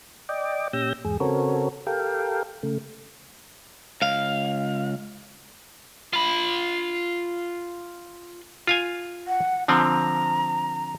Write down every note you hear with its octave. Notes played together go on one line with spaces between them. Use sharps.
D5 D#5 G5 D6
A#2 C#4 G4 E6 G6 A#6
E2 G#2 G#4
C#3 C4 F#4 A4 A#4 C#5
G4 A4 A#4 F5 G5
C#3 A3
C#2 F5
F4 B5
F4 F5 G#5
F#5
D3 F3 C4 A#5